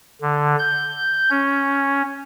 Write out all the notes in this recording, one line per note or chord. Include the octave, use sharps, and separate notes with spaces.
D3
G6
C#4